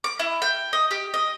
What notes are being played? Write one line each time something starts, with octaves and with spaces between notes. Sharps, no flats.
D6
E4
G5
D#5
G4
D#5